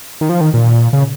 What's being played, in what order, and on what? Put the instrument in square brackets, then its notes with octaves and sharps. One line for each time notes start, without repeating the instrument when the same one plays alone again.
[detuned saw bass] D#3
F3
D#3
A#2
C#3